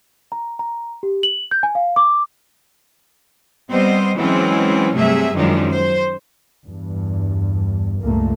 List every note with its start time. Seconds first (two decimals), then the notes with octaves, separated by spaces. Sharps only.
0.32 A#5
0.59 A#5
1.03 G4
1.23 F#7
1.51 G6
1.63 G#5
1.75 F5
1.96 D6
3.70 G3 B3 C4 C5 D#5
4.16 E3 F#3 G#3 C4 C#4
4.94 G2 C3 F#3 A3 G#4 E5
5.34 F#2 D#3 F3 F#3 G#3 D4
5.70 C5
6.65 E2 G2
8.01 C#2 G2 A#2 A3 A#3